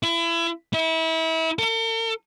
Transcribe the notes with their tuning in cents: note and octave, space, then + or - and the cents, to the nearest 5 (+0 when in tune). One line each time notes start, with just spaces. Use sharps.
E4 +30
E4 -30
A4 +45